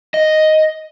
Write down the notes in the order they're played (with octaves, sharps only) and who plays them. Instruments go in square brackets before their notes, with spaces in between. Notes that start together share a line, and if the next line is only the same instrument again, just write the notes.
[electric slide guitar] D#5